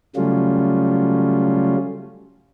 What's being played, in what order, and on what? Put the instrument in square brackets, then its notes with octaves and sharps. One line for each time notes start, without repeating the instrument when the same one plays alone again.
[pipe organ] C#3 F#3 G3 A3 C#4 F4